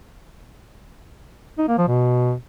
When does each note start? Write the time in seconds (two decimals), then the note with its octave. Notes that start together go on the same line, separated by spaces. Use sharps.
1.58 D#4
1.68 A#3
1.78 F3
1.88 B2